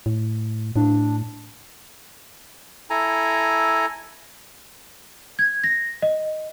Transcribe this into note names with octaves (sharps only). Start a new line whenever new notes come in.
A2
A2 D4
E4 A4 G#5 A#5
G#6
A#6
D#5